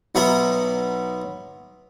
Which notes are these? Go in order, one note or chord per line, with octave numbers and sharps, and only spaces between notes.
B1 F#3 B3 E5 A#5 B5